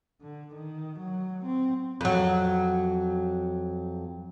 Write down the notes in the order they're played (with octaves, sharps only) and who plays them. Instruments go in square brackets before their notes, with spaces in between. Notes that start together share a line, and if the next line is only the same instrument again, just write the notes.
[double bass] D3
D#3
F#3
C4
[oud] F2 F#3